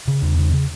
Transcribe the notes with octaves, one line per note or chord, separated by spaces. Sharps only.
C#3
E2
C#3
C#3